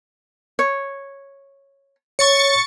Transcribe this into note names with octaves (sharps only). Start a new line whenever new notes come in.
C#5
C#5 C#6 A6 C#7